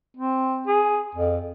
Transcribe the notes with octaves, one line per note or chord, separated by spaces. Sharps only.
C4
G#4
F2